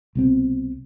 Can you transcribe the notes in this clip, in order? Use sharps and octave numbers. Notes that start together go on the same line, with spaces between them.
C2 B2 C4